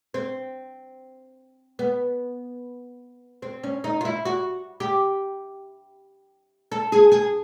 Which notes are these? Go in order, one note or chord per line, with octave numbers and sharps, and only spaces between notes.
C4
B3
C4
C#4
D#4
F4
E4
F#4
G4
A4
G#4
G#4